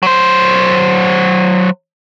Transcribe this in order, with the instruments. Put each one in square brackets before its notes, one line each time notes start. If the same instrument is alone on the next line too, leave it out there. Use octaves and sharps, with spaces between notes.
[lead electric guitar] F#3 C5